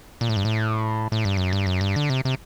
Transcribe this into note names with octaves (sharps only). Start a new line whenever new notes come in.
A#2
A2
G2
A2
A2
G2
F#2
G2
F#2
G2
D3
C3
C3